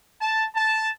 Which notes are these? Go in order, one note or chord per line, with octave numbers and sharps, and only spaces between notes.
A5
A5